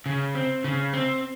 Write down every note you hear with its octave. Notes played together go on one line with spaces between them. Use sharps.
C#3
C4
C#3
C4